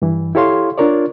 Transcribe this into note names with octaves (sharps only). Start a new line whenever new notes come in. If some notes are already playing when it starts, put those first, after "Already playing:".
G2 E3
E4 G4 A4 C#5 F5 C6
D4 F4 A#4 C#5 D5